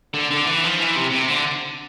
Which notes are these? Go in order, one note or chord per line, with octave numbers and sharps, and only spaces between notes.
D3
D3
E3
F3
E3
C3
C3
D3